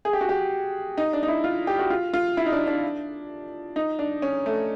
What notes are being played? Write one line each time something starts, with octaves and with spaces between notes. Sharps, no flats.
G#4
G4
F#4
G4
D#4
D4
D#4
E4
F4
G4
F#4
F4
F4
E4
D#4
D4
D4
D#4
D4
C#4
A3